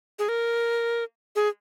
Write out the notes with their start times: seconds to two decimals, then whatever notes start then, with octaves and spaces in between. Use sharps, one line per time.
0.19 G#4
0.29 A#4
1.36 G#4